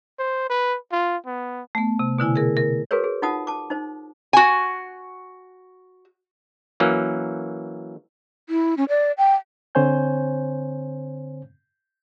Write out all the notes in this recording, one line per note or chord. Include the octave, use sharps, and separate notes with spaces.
C5
B4
F4
B3
A3 B3
C3
B2 D3 E4 G#5
G#4 A#4
A#4
F#4 G#4 A#4 B4 C#5
G#4
D#4 F4 F#5 A5 D#6
A5 D6
D#4 C5
F#4 G#5
E3 F#3 A#3 C#4
E4
C#4
D5
G5
D3 C4 C5 C#5 G#5 G6